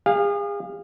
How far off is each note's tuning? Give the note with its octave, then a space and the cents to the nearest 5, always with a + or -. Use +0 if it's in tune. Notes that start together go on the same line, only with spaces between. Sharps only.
G#4 -35 F5 +0